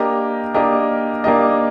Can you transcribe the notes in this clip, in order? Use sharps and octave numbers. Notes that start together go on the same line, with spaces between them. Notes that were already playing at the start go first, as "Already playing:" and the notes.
Already playing: A#3 D4 G4 A#4 D#5
A#3 D4 G4 A#4 D#5
A#3 D4 G4 A#4 D#5